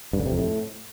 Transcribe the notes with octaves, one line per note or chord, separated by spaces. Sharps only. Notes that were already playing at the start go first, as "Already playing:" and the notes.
G2
D3
C3
F2
A2